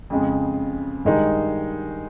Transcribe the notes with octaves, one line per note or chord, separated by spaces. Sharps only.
F2 C#3 G#3
G2 D#3 G#3 D#4